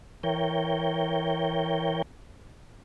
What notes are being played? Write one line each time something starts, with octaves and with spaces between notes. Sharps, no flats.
E3 A#4 C#5 G5